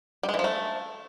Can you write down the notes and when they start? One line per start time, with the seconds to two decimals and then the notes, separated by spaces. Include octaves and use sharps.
0.23 G3
0.29 G#3
0.34 E3
0.39 F3
0.44 A3